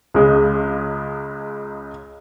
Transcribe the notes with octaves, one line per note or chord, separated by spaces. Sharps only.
C#2 C#3 G#3